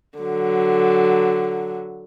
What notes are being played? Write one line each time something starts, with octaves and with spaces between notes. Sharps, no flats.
D3 F#3